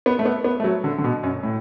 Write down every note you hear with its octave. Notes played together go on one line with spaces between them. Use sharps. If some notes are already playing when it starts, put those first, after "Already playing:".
B3
A3
B3
B3
A3
F#3
D3
D3
B2
F#2
A2